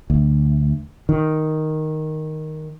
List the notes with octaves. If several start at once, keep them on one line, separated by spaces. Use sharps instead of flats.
D2
D#3